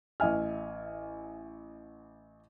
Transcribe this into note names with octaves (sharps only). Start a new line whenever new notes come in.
A1 E5 G#5 F6